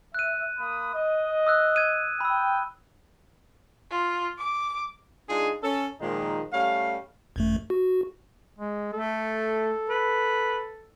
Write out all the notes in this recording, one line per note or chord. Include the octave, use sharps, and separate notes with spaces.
E5 F#6 D#7
A#3 B5 D#6
D#5
D#6 E6 F#6
G#6 D#7
G5 B5 E6
F4
D6
G#3 D4 D#4 F4 G#4
C#4 A4
A#2 D#3 F3 G#3 D#4
G3 A3 C#4 F5
G#1 F#2 A3
F#4
G#3
A3 A4
B4